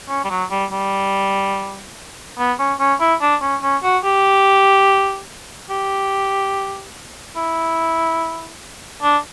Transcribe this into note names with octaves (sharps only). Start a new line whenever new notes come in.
C#4
G3
F#3
G3
G3
B3
C#4
C#4
E4
D4
C#4
C#4
F#4
G4
G4
E4
D4